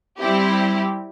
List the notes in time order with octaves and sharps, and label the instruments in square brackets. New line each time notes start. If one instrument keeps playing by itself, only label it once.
[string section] G3 C4 E4 G4